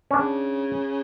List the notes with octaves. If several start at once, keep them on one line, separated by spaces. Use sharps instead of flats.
C#4
C#3 D4